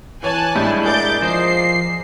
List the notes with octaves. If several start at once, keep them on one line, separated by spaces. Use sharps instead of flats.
E3 C#5 G#5 A5 F#6
A2 G3 G#3 D4 E4 G6
G#4 A#4 D5 D6 G6 A6
F3 C5 D#5 C7